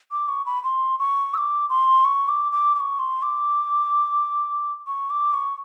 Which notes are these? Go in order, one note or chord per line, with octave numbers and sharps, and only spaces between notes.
D6
C#6
B5
C6
C#6
E6
D6
C6
C#6
D6
D6
D6
C#6
C6
D6
C#6
D6
C#6